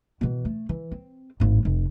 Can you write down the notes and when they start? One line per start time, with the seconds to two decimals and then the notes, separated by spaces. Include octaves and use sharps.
0.21 B2 E3
0.45 A3
0.69 E3
0.91 C4
1.40 G#1 A2
1.65 F1